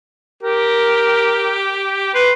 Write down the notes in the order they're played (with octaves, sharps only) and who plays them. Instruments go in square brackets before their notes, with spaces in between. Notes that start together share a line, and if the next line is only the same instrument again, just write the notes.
[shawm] G4 [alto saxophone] A#4
[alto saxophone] B4 [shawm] C6